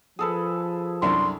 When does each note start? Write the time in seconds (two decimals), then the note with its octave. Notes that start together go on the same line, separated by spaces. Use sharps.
0.19 F3 G#4 A4 B4
1.02 C2 F#2 D4 C6